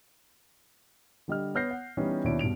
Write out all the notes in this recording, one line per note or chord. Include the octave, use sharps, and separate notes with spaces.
D3 G3 D#5 F6
B3 C#5 F6 G6 A#6 C7
F#5
E3 G3 B3 C#4 D#4
D#2 B2 D4 E4 C#5 D7
G2 B2 D7 F7